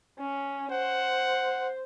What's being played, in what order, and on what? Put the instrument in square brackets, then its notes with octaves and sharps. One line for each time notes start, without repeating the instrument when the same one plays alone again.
[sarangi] C#4
[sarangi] C5 [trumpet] F#5